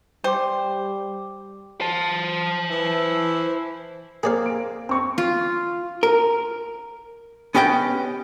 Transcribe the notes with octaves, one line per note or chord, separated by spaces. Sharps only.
G3 C5 G5 D6
C5 A5
E3 E4
A#3 C4 G#4 D5 F5
D7
C4 C#6
F4
A#4
B3 C#4 G4 D#5 G5